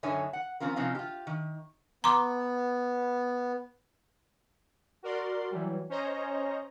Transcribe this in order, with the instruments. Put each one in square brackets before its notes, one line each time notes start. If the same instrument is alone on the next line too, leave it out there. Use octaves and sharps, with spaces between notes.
[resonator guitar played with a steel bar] F#2 D3 D#4 C#5 E5 G#5
F#5
F3 C4 C#4 F4 A#4
C3 F3 C4 C#4 D#4 F4
F4 G4
D#3
[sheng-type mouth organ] B3 [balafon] A#5 C6 D6
[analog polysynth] F#4 A#4 D5 C6
E3 F#3 G3
C#4 C5 C#5 D#5 A#5